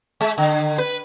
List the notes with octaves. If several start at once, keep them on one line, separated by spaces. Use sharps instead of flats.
G#3
D3
B4